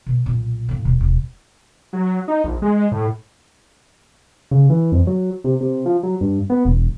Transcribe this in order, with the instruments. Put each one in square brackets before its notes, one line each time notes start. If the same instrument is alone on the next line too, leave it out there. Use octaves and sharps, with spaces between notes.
[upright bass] B2
B1 A#2
A2 A#3
D#1 B2
D#1 B2
[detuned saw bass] F#3
D#4
A#1
G#3
A2
[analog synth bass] C#3
E3
F2
F#3
C3
C3
F3
F#3
G2
B3
E1